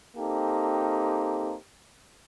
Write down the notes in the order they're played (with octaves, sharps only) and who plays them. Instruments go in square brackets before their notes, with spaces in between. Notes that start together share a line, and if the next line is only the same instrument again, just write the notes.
[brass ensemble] A#3 C4 D#4 G4 A4